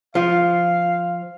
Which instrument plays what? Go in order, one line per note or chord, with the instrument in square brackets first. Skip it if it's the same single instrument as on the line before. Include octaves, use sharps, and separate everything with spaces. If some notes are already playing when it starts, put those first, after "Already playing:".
[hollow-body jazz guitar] F3 F4 [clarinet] F5